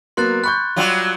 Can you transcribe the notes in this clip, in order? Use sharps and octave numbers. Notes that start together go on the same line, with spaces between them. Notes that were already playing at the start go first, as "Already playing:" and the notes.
F#3 A#3 B3 C6 F#6 A6
B5 C#6 F#6 G6
F#3 G3 F4